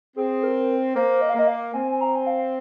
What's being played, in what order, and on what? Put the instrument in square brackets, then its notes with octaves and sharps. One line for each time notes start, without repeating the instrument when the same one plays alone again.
[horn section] C4 [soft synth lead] G#4
[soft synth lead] A#4
[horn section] A#3 [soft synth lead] C5
[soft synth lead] D#5
F5
[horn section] A#3 [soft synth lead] D#5
[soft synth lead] F5
[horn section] C4 [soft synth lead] G#5
[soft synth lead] G#5
A#5
G#5
F5